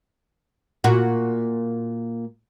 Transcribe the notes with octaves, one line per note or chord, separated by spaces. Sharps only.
A#2 F#4